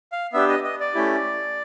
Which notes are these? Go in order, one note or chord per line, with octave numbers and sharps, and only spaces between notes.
F5
B3 D4 G4 E5
D#5
D#5
D5
A3 C#4 E4 G4